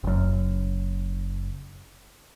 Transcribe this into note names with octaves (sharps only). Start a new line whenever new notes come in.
F#1 F#2